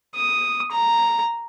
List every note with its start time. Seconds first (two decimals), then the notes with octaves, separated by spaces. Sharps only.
0.15 D#6
0.72 A#5